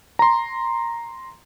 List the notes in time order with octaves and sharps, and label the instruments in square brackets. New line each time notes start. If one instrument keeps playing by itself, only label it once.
[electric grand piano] A#5 C6